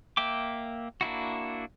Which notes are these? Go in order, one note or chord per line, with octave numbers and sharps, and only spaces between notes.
A#3 E5 G5 D6
A#3 D4 E4 F#4